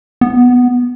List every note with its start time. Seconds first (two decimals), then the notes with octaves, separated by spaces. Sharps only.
0.21 B3